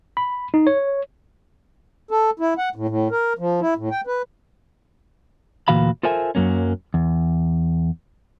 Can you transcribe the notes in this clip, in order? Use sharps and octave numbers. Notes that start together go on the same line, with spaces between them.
B5
D#4
C#5
A4
E4
F#5
A2
A2
A#4
F3
E4
A2
G5
B4
D2 A#2 E3 F#4 F5 B5
F4 A4 A#4 C5 E5 G#5
F#2 F#3 A#3 C#4
E2